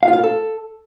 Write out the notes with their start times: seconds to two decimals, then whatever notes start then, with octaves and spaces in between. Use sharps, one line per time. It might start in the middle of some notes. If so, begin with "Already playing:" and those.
0.03 F5
0.08 F4
0.13 F5
0.18 A#4
0.24 A4